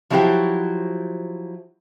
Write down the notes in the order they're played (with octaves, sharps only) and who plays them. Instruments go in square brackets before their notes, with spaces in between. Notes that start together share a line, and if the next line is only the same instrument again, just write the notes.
[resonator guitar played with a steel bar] F3 F#3 E4 F#4 G4 C5